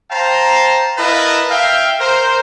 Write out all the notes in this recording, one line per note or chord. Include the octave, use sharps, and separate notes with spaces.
C5 F5 G5 A5 A#5
E4 A#4 B4 D#5 F5 A5
E5 F5 G5
A#4 C5